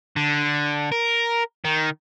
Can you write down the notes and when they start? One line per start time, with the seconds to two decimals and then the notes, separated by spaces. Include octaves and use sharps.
0.16 D3
0.92 A#4
1.65 D#3